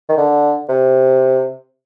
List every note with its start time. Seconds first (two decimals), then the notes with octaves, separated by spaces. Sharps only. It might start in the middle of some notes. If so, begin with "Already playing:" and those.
0.09 D#3
0.17 D3
0.69 C3